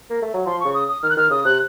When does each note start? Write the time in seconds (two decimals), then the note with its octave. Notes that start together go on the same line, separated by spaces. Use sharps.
0.10 A#3
0.22 A3
0.34 F#3
0.46 F3 C6
0.60 C#3 C#6
0.74 D#6
0.88 D#6
1.03 D#3 F6
1.10 F#6
1.17 D#3 F6
1.31 C#3 D#6
1.45 C3 F#6